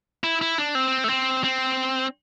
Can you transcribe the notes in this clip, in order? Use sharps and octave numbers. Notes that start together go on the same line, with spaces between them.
E4
E4
D4
C4
A3
C4
C4